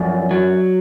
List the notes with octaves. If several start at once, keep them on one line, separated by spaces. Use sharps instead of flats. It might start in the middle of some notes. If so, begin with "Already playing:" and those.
Already playing: F#2 F3 D5 E5
F#3